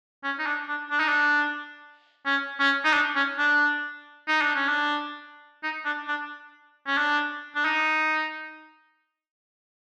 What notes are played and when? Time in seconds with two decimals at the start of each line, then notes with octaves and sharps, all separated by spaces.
0.24 C#4
0.39 D#4
0.46 D4
0.68 D4
0.91 D4
0.99 D#4
1.09 D4
2.26 C#4
2.60 C#4
2.84 D#4
2.93 D4
3.15 C#4
3.38 D4
4.28 D#4
4.41 D4
4.55 C#4
4.68 D4
5.63 D#4
5.85 D4
6.08 D4
6.87 C#4
6.97 D4
7.55 D4
7.65 D#4